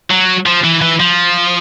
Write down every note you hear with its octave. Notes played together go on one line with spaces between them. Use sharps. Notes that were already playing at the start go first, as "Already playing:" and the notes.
F#3
F3
E3
E3
F3